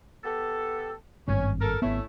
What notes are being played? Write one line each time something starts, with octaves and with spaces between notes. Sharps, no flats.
B3 G4 A4
G#1 G2 C4 C#4
A4 A#4
G#1 A3 B3 C#4 E4